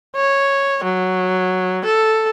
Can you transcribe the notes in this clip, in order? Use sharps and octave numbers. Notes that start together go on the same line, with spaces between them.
C#5
F#3
A4